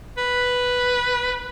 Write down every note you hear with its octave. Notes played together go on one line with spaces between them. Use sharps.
B4